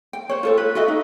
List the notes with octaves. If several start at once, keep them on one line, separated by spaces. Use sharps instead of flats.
G5
C5 C#5
F4 A4 C#5
B4
F#4 A4 D#5 E5
D#4